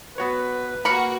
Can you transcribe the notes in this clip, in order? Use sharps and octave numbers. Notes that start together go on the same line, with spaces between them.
B3 F#4 B4 C#5
A#3 F#4 A#4 B5 C#6